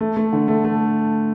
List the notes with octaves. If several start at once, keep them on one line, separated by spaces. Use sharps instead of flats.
A3
A3
D3
A3
A3